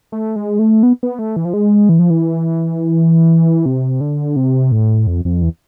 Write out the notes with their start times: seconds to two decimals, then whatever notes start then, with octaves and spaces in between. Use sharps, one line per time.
0.12 A3
0.36 G#3
0.59 A3
0.83 B3
1.03 B3
1.19 A3
1.36 E3
1.45 F3
1.54 G#3
1.89 E3
1.99 F3
2.10 E3
3.66 C3
4.01 D3
4.36 C3
4.72 A2
5.07 F2
5.25 F2
5.42 E2